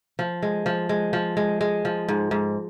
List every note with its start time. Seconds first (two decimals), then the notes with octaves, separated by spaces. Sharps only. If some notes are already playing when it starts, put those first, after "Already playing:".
0.19 F3
0.42 G#3
0.66 F3
0.89 G#3
1.13 F3
1.37 G#3
1.61 G#3
1.85 F3
2.08 G#2
2.31 G#2